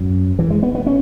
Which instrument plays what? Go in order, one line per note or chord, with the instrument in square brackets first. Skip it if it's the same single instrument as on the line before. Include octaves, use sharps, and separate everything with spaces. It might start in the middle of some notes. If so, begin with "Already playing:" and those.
Already playing: [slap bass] F#2
E3
G#3
B3
B3
C#4